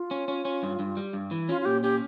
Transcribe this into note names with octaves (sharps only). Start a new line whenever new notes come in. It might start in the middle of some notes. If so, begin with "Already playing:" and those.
Already playing: F4
C#4
C#4
C#4
G2
G2
G3
G2
E3
C#4 F4
F4
A#2 G4
C#4 G4